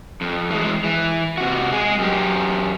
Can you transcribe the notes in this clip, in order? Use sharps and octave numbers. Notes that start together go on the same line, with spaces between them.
F2
E3 G#3
E3
C3 F#4
G#3 G#4
F#2 G4